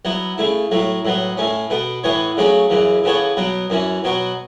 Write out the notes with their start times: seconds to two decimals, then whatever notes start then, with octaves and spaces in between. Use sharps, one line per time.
0.05 F#3 B3 E4
0.38 C#3 A3 E4
0.71 A2 F#3 A3
1.05 A2 F#3 B3
1.37 A2 A3 C#4
1.70 B2 B3 A4
2.04 A2 E3 B3 E4 C#5
2.37 C#3 F#3 A3 C#4 F#4
2.70 F#2 C#3 E3
3.04 C#3 E3 B3 A4 C#5
3.37 B2 F#3 B3
3.70 F#2 E3 C#4
4.04 B2 F#3 B3 F#4